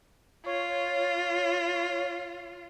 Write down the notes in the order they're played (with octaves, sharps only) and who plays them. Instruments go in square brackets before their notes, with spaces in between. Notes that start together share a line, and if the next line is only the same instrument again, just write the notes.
[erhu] F4 [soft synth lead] C#5